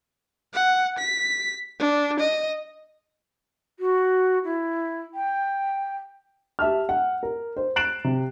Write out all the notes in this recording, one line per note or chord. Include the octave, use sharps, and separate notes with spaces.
F#5
B6
D4
D#5
F#4
E4
G5
G4 E5 A5 F6
F#5
A#4
C5
F#6 A6 C7 D7 E7 F#7
C3